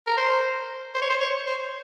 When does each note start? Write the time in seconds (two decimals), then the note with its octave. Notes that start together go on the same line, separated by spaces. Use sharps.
0.07 A#4
0.17 C5
0.94 C5
1.01 C#5
1.09 C5
1.20 C#5
1.46 C5